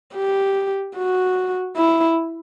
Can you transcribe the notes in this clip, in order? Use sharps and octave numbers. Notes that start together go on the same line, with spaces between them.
G4
F#4
E4